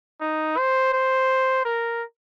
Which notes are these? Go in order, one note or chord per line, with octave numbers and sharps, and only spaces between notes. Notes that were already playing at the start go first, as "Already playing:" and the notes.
D#4
C5
C5
A#4